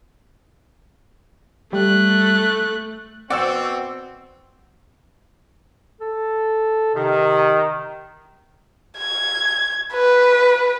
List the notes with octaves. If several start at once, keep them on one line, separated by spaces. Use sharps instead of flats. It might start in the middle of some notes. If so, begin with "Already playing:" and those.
G3 A3 F#6
B2 C4 D5 F#5 C#6 E6 C#7
A4
C3 D#3
G#6
B4